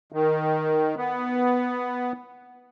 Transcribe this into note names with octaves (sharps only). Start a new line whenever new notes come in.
D#3
B3